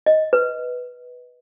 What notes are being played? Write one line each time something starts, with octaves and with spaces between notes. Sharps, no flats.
D#5
B4